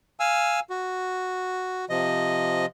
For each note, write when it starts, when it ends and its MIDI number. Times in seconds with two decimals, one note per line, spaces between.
0.20 0.60 77
0.20 0.60 80
0.20 0.60 88
0.70 1.85 66
1.90 2.66 48
1.90 2.66 53
1.90 2.66 75